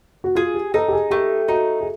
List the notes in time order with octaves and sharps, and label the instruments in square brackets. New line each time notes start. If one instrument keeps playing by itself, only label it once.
[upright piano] F#4
[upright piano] F4 [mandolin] G#4
[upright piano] G4
[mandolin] D#4 [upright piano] A4
[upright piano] G4
G#4
[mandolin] A3 [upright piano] G4
[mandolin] D#4 [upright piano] F#4
[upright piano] G#4